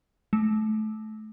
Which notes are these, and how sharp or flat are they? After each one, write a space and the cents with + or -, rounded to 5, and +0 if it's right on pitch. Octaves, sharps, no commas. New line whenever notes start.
A3 -25